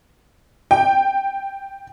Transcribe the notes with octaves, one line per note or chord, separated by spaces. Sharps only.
G5